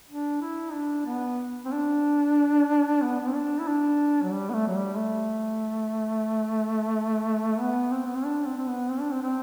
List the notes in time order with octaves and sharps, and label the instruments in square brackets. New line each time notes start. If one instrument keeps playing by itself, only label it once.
[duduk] D4
E4
D4
B3
C4
D4
B3
B3
C4
D4
E4
D4
F#3
G3
B3
A3
F#3
G3
A3
B3
C4
B3
C4
D4
C4
C4
B3
C4
D4
C4
C4